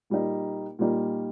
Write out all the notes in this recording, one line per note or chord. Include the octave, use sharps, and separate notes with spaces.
A#2 G3 A#3 D#4
A#2 G3 A#3 D#4